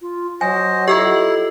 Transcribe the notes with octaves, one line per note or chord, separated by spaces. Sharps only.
F4
F#3 C5 D#5 G#5
E4 F4 G4 A4 D#5